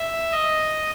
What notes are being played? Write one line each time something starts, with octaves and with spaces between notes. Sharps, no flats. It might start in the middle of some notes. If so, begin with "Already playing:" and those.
Already playing: E5
D#5